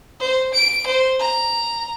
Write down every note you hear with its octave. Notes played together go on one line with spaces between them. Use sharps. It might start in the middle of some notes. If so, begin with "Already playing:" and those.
C5
D7
C5
A#5